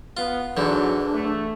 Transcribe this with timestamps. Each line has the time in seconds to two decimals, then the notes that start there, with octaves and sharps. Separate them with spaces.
0.17 B3 F4
0.57 E2 G#2 D3 F#3 D4
1.14 A3